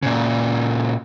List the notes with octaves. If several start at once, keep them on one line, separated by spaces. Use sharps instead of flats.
A#2 C#3